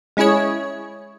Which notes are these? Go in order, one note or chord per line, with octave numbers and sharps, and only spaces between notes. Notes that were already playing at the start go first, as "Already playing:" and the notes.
G#3 C#4 E4 G#4 C#5